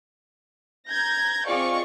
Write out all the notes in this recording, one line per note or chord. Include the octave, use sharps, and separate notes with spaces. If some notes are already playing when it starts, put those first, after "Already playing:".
A#5 G6 G#6 A#6
C4 F4 G#4 D5 D#5 C#6